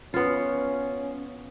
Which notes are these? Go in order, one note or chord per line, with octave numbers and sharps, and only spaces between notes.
B3 C#4 F4